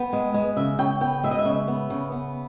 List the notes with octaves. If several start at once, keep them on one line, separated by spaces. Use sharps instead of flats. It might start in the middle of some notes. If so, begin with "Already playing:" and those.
Already playing: B3 G5
G#3
G#3
C#3 E5
C#3 G5
B3 G5
G#3 E5
D#5
E5
C#3
B3
C#3
B3